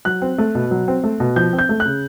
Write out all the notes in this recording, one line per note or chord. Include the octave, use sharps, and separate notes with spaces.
F#3 F#6
C4
A3
B2
F#3
C4
A3
B2
F3 G6
C4
G6
A3
F#6
C#3